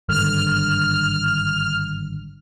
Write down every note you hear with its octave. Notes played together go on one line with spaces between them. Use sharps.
G#1 G2 D3 F6